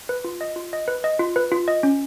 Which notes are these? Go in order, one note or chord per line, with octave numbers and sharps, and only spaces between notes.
B4
F4
D#5
F4
D#5
B4
D#5
F4
B4
F4
D#5
C#4